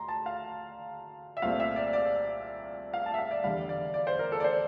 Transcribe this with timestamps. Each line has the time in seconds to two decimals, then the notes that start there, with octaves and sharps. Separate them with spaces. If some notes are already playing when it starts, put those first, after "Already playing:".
Already playing: D2 A#5 C6
0.08 A5
0.26 F5
1.37 E5
1.42 C2 A#2 A3 C4 F5
1.60 E5
1.76 D5
1.93 D5
2.94 F5
3.06 A5
3.14 E5
3.18 F5
3.31 D5
3.44 F1 E2 D3 G3 F5
3.69 D5
3.94 D5
4.07 C5
4.19 A#4
4.32 A4
4.40 D5
4.44 C5